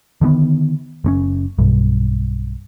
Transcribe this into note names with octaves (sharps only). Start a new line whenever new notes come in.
D3 D#3 G#3 B3
F#1 C4 C#4
B1 G2